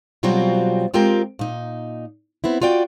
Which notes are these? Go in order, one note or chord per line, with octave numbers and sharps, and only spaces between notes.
B2 F#3 G3 C4 F4 F#4
G#3 C4 F4 G4 A#4 G5
A#2 D#4
B3 C4 E4
F4 F#4 D5 G5